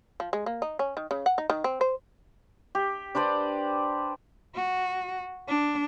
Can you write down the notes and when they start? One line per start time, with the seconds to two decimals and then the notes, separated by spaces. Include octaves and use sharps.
0.20 F3
0.33 G#3
0.46 A#3
0.62 D#4
0.79 C#4
0.97 D#3
1.11 C#3
1.26 F#5
1.38 D#4
1.50 D#3
1.64 C4
1.81 C5
2.75 G4
3.15 D4 B4 C5 D5
4.55 F#4
5.48 D4